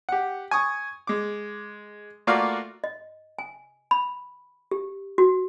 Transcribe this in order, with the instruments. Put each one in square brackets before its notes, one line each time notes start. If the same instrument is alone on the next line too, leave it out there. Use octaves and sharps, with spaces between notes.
[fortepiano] G4 F#5
G#5 C#6 D#6
G#3 D6
A3 A#3 F4 F#4 D5 F5
[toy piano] D#5
G#5
B5
G4
F#4